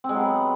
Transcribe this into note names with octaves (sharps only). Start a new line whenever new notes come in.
C4
G#3
F#3
B3